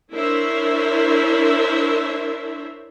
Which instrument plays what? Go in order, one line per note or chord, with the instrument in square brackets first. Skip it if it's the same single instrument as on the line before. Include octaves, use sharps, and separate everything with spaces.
[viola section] D4 E4 A#4 C5 C#5 E5